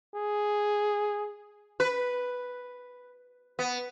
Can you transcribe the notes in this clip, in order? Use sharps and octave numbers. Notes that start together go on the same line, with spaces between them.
G#4
B4
B3